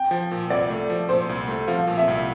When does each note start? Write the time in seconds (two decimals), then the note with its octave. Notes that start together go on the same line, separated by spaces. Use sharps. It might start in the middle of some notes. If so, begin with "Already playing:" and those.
Already playing: G5
0.11 F3
0.31 A#2
0.50 C2 D5
0.70 A3
0.89 F3
1.09 A#2 C5
1.29 C2
1.48 A3
1.68 F3 F5
1.87 A#2
1.98 E5
2.08 C2